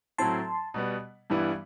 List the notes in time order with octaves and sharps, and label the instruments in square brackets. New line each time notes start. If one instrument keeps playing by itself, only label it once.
[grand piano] A2 F#3 C4 E4 [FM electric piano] A5 C6
[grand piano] B2 G3 B3
G2 E3 G3 B3 E4